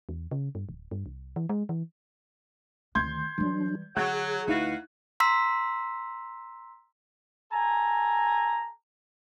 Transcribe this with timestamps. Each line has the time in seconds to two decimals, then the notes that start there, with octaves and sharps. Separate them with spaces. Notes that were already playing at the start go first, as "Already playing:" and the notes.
0.09 E2
0.31 C#3
0.55 G2
0.69 D1
0.91 G2
1.06 C2
1.36 E3
1.49 G#3
1.69 E3
2.95 D2 D#3 C6 G6 G#6
3.38 E3 F#3 G3 D4
3.96 D3 F#3 G#4 F#5 F#6 G#6
4.47 D2 D#4 E4 F#4 B4 F5
5.20 A#5 C6 E6 B6
7.52 A4 G#5 A#5